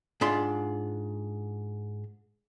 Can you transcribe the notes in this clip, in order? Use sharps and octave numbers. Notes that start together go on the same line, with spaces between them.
G#2 D4 F4 B5 C6